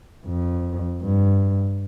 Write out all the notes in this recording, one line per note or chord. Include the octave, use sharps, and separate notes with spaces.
F2
G2